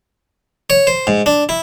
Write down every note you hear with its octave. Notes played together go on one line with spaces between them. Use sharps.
C#5
C5
G#2
D4
E4